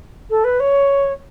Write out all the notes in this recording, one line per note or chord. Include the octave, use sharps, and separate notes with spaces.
A4
B4
C#5